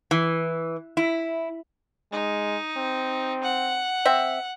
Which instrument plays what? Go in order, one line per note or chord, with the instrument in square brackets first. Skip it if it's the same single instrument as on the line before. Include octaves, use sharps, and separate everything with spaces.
[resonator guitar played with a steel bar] E3
E4
[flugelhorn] G#3 [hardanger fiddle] D#4
[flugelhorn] C4
[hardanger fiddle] F#5
[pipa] C4 E5